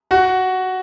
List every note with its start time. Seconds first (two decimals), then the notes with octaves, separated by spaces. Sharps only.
0.11 F#4 F#5